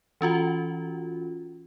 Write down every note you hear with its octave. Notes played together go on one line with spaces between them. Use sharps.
E3 C#4 F4 F#4